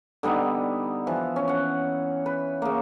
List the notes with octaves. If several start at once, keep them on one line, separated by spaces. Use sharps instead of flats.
D3 G3 B3 D#4
E3 F3
C#4
C#4 F#5
B4
C#3 A#3